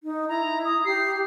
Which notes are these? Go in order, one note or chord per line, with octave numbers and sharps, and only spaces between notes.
D#4
E4 A#5
D#6
G4 C7